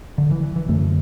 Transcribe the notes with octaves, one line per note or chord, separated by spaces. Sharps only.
D3
E3
E3
E3
F#2 D3 A3